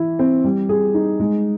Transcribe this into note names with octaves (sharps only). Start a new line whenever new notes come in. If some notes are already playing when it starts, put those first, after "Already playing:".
Already playing: E3 E4
C4
G3
G#4
D#4
G#3